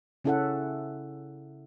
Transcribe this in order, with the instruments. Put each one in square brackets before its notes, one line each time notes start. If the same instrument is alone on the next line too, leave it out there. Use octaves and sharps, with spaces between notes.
[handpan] C#3 C#4 E4 A4 E5 F#5